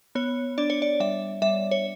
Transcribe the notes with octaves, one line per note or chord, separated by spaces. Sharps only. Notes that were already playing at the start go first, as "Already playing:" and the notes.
B3 C#5
D4 D5
C#5
D5
G3 E5
G3 E5
C#5